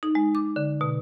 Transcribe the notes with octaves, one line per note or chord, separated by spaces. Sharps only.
D#4
G#3
D6
D3
B2